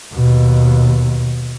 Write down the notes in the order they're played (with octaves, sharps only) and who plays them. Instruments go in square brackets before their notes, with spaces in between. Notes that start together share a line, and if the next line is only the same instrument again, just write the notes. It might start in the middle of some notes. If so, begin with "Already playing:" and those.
[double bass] D#2 B2